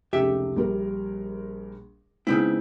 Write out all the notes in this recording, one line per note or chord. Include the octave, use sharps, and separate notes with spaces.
F1 C#2 G4 E5
A#1 G3 A#4
C#3 G#3 B3 C4 D#4 E4